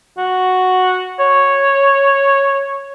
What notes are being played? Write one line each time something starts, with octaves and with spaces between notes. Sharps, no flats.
F#4
C#5